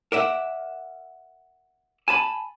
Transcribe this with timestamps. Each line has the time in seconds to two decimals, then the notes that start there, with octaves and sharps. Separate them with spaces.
0.12 A#4 D5 E5 F#5
2.08 G#5 A5 B5